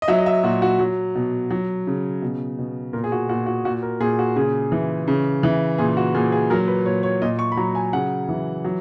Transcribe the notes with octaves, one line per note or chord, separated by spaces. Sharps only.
D#5
F#3 E5
D#5
E5
A#2 F#4
F#4
F#3
B2
F#3
C#3
B2
B2
A#2 A#4
G#4
F#4
A#2 F#4
F#4
A#2 F#4
A#4
A#2 G#4
F#4
C#3 G#4
E3
C#3
E3
A#2 G#4
F#4
A#2 G#4
G#4
F#3 A#4
B4
A#2 C#5
C#5
A#2 D#5
C#6
B5
F#3 A#5
G#5
C#3 F#5
E3
F#3